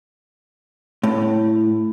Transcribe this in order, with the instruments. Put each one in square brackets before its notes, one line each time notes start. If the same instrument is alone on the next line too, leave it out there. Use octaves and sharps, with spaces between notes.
[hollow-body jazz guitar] A2